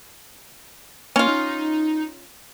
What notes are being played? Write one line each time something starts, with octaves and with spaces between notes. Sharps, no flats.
A#3 C#4 F4
D#4